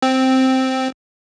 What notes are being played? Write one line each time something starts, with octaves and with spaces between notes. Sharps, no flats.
C4